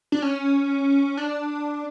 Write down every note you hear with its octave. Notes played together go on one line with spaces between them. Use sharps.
D4
C#4
D4